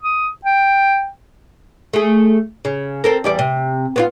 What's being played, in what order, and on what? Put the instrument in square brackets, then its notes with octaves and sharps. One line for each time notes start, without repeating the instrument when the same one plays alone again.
[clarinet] D#6
G5
[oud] A3 G#4
C#3
C4 A4 A#4
E2 G3 D5
C3
B3 C4 F4